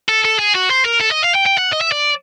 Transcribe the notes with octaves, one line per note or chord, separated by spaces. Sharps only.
A4
A4
G#4
F#4
C5
A#4
A4
D#5
F5
G5
G5
F#5
D#5
E5
D5